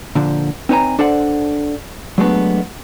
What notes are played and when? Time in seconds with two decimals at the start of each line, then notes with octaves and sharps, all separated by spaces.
0.15 A#2 D3 F3
0.69 C4 D#4 B4 C#5 G#5 A#5
0.99 D4 A4 C5 D5 F#5
2.18 F#3 G#3 A3 B3 D4